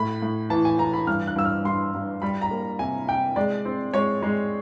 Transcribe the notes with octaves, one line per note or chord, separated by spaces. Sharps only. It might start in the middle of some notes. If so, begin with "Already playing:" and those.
Already playing: A2 B5
A2
E3 A5
G#5
E3 A#5
B5
G2 F6
F#6
G2 E6
F6
G2 C6
G2
G3 B5
A#5
A#3
C3 G#5
C3 G5
G#3 D5
C4
G#3 C#5
G#3